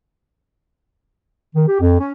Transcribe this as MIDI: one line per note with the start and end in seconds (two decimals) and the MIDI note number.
1.55 1.63 51
1.67 1.79 67
1.80 1.98 41
1.99 2.12 61